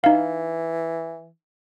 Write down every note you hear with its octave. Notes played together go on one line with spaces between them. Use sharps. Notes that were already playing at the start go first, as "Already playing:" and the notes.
E3 D#4 F5